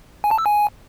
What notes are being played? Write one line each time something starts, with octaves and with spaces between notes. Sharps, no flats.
G#5
A5
E6
G#5